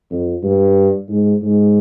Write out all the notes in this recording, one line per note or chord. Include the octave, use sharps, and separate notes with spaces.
F2
G2
G#2
G#2